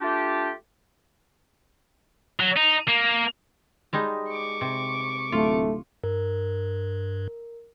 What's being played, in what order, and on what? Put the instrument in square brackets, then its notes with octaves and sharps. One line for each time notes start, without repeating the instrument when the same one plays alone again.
[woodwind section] A3 D4 F4 G4
[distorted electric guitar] F#3
D#4
A#3
[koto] G3 G#3 D#4
[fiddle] C#6 D6
[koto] C3
[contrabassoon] D1 [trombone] A3 [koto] F4
[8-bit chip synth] G2 [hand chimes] A#4